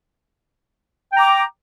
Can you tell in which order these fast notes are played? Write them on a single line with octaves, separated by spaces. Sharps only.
G5 A#5 D6